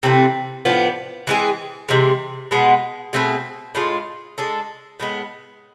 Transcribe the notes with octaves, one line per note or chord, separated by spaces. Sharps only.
C3 E3 A3 C4
A2 F3 B3 D4
E3 G#3 C4 G#4
C3 E3 G#3
B2 G#3 B3
B2 A3 C4 G#4
A2 G#3 D4 F4
G#3 D4 A4
A2 G#3 B3